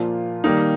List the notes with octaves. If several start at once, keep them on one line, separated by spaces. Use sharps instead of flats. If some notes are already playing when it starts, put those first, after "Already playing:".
Already playing: A#2 F3 A#3 F4
D#3 G3 A#3 D#4